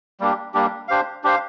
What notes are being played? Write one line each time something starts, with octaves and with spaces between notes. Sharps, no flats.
G3 A#3 D4 G4
G3 A#3 D4 G4
D4 G4 C5 F5
D4 G4 C5 F5